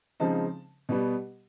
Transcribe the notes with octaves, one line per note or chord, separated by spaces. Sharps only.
C#3 F3 G#3 C4 D#4 A5
B2 G3 B3